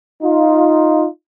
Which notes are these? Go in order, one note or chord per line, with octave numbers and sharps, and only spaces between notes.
D#4 F4